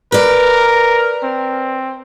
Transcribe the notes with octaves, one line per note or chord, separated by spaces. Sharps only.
A#4 B4 D5
C4